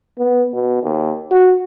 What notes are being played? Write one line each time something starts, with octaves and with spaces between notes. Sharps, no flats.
B3
B2
D#2
F#4